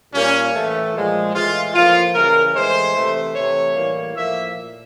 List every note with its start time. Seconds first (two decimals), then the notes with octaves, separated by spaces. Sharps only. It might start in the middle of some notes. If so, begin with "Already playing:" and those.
0.14 A#2 G3 A#3 C#4
0.54 A2 E3 A3
0.94 A#2 F3 G#3
1.35 A2 E3 G#3 F4
1.75 A2 F3 A#3 F4
2.14 C#3 E3 G3 A#4
2.55 A2 E3 G#3 C5
2.96 C3 E3 A3
3.35 C3 E3 A3 C#5
3.75 A2 E3 G3 A#3
4.16 A2 F3 A#3 E5
4.56 A#2